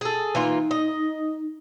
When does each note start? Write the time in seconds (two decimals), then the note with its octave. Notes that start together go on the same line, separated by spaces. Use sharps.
0.01 G#4 A4
0.35 E3 A#3 D#4 F4
0.71 D#5